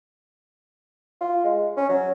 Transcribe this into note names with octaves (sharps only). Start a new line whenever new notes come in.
F4
G#3
C#4
F#3